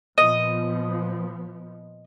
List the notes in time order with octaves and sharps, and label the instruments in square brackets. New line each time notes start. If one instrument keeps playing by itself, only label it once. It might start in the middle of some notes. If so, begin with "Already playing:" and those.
[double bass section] A#2 F3 B3 [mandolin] D#5